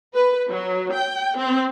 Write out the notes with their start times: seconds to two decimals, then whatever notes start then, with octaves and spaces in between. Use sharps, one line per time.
0.15 B4
0.49 F#3
0.92 G5
1.38 C4